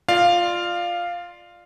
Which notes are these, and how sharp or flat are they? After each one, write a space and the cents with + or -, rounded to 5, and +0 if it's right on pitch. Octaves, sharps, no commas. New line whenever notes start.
F4 +0 D5 +25 F5 +0